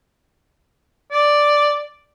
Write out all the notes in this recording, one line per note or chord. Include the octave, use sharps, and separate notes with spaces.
D5